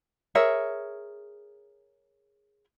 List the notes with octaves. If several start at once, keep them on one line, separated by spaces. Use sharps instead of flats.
G#4 A#4 C#5 E5